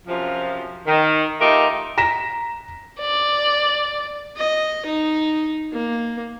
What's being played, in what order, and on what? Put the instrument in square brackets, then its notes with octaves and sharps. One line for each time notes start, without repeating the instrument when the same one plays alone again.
[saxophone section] F#2 C3 F3
D#3
A3 D#4 F4 G4 A#4
[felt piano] A#5 A#6 B6 E7
[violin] D5
[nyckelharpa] D#5
D#4
A#3